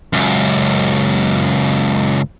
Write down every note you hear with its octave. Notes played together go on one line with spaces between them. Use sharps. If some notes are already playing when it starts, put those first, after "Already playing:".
C#2 F#2